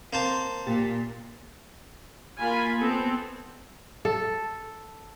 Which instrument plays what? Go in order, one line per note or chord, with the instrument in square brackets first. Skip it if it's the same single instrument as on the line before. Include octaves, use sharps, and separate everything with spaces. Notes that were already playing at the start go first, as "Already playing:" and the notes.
[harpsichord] A#3 C5 A5 [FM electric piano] C4 A#4
[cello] A#2 [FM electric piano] G4 A6
[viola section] A#3 F4 G#5 B5
B3 C4 A4
[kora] A4